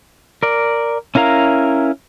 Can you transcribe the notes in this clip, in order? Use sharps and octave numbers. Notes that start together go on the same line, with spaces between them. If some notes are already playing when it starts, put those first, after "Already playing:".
A#4 D5
C#4 E4 A#4 F5 A#5